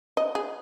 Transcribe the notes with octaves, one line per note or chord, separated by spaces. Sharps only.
D#5
G#4